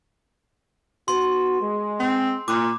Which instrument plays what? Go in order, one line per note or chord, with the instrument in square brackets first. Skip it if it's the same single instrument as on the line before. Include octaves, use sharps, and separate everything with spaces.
[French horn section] B3 F#4 [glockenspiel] C6
[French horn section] G#3
[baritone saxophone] C4
[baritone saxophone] A#2 [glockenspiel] D6